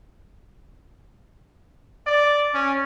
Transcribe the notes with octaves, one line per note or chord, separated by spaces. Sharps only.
D5
C#4